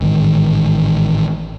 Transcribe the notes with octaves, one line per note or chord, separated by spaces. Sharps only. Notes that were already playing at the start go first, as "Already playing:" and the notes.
A1 G#2 D#3 G#3